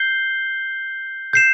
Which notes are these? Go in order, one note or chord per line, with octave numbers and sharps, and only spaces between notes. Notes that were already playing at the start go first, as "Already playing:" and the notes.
Already playing: G6 C7 G7
G6 C7 E7